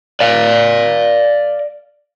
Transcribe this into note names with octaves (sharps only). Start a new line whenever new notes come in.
D5 F5